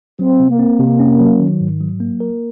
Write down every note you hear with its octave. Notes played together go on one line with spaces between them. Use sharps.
F#3 C4
C3
A#3
C4
C3
C#4
F#3
D#3
G#2
F#3
A#3
A#4